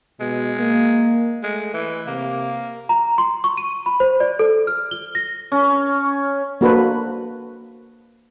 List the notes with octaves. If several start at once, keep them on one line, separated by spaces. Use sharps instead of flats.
B2 G#3
A#3
G#3 A3
E3
C3 A#3
A#5
C6
C#6
D#7
B5
C5
D5
A4
F6
G7
A#6
C#4
A#3 D4 F#4 A4 B4 C5